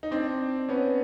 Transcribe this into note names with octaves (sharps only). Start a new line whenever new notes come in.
D#4
C4 D4
B3 C#4